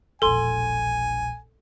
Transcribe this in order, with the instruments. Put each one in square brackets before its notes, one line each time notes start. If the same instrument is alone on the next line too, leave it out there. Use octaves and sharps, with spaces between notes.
[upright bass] E1 A#1 [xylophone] A4 C6 [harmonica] G#5